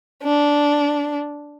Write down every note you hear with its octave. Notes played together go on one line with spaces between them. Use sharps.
D4